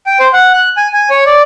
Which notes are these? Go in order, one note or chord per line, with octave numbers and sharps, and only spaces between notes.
G5
C5
F#5
F#6
G#5
G#5
C#5
D5